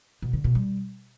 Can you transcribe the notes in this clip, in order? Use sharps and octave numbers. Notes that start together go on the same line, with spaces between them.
B2
D3
B2
G3